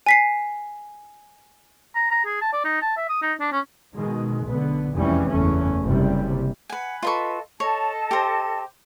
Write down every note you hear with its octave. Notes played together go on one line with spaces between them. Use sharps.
G#5 B6 C7
A#5
A#5
G#4
A5
D5
D#4
A5
E5
D#6
D#4
D4
C#4
B2 D#3 G#3
B1 D3 B3
F1 E2 E3 G3 C#4
F#1 E2 A3 C#4
F#1 C3 G3
B4 F#5 G#5
F4 A4 B4 D#5 B5 C#6
A4 C#5 D#5 A5
G4 C5